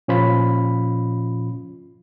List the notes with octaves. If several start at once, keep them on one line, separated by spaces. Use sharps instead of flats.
A#2 F3 C#4 F4 B5